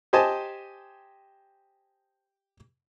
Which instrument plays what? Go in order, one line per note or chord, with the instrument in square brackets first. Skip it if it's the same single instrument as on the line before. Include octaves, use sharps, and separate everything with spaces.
[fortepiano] G4 C5 D#5 G#5 A5